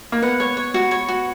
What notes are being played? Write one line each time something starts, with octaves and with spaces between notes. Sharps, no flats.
A#3
B3 F#5
C#5
C#5
F#4
C#5
F#4